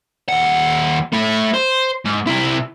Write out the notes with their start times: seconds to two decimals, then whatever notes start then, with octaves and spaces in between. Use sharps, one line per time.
0.29 D#2 F#5
1.12 A3 E4
1.54 C5
2.05 G#2
2.27 C3 E4